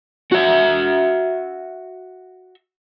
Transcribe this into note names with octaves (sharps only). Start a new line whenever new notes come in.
F#4 E5